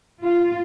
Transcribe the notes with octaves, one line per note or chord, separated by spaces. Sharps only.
F4